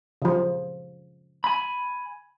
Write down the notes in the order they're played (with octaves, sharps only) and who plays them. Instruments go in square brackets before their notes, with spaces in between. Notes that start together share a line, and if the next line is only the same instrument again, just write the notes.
[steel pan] C#3 F3
[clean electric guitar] G#5 B5